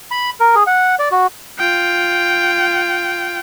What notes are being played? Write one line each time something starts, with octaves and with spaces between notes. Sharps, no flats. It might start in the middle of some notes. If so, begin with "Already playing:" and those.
B5
A#4
G#4
F#5
D5
F#4
F4 G5